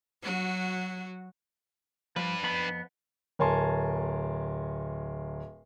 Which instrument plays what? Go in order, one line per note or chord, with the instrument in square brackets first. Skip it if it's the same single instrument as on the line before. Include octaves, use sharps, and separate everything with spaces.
[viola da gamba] F#3 F#4
[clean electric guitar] F3 G3 [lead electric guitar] D4 B4
[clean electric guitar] F2 B3 B5
[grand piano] D1 A#4 C#5 G#5 A5 C6